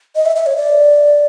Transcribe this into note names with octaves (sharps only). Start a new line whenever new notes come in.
D#5
E5
E5
C#5
D5